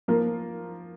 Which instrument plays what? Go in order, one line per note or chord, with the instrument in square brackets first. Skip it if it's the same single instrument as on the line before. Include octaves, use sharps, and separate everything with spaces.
[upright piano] F3 A#3 F4 A#4